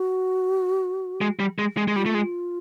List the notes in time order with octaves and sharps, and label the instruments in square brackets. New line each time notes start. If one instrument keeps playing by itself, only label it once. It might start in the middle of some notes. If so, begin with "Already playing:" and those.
Already playing: [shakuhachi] F#4
[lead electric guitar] G#3
G3
G#3
G#3
G#3
[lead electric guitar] G3 [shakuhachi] F4
[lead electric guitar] A3
G#3